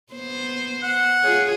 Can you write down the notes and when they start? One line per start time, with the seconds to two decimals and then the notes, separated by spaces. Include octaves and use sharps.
0.13 B3 C5
0.83 F#5
1.22 F4 G#4 C#5